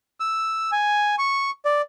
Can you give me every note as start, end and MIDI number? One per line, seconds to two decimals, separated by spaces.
0.20 0.71 88
0.72 1.15 80
1.18 1.50 85
1.65 1.81 74